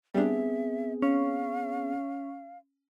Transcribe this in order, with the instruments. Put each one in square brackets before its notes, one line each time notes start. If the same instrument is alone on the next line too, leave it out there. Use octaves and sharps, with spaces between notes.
[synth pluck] G3 D4 [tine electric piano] B3 C4 G#4 [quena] E5
[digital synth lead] C#4 [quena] F5